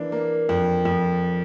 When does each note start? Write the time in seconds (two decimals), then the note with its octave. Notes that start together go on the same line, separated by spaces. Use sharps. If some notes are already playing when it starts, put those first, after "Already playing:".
Already playing: E3 A#3 D4
0.12 A#3
0.49 F2
0.85 F2